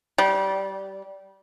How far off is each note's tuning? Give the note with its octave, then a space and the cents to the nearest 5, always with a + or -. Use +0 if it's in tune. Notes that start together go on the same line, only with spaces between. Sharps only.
G3 -20